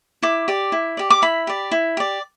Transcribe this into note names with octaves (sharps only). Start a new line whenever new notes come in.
E4 D6
G4 D5
E4
G4 D5
D6
E4 B5
G4 D5
E4
G4 D5